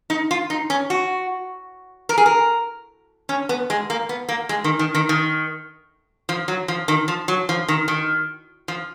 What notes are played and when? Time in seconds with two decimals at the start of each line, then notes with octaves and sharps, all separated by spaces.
0.10 D#4
0.31 F4
0.50 D#4
0.70 C#4
0.90 F#4
2.09 A#4
2.18 G#4
2.26 A#4
3.29 C#4
3.49 B3
3.70 G#3
3.90 A#3
4.09 B3
4.29 A#3
4.49 G#3
4.64 D#3
4.79 D#3
4.95 D#3
5.09 D#3
6.29 F3
6.48 F#3
6.68 F3
6.88 D#3
7.08 F3
7.28 F#3
7.49 F3
7.68 D#3
7.88 D#3
8.68 F3